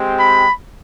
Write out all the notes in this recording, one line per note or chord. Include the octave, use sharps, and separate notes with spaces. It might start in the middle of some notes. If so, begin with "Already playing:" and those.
Already playing: G#3 C4 G4
B5